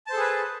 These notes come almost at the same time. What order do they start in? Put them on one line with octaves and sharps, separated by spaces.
A5 C5 A4 G#4 B4